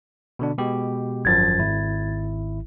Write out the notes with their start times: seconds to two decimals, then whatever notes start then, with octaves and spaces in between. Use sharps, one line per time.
0.39 B2 D3 D4
0.58 B2 G#3 G4
1.25 G#1 F#2 F3 G#6 A6
1.59 G#1 E4